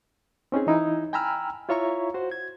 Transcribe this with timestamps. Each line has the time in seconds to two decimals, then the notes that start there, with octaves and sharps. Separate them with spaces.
0.52 C4 C#4 D#4 G#4
0.67 E3 D#4 E4
1.13 G5 G#5 A#5 B5 E6 F6
1.68 E4 F4 C#5 E5 A#5 C#6
2.14 F#4 C5
2.31 G#6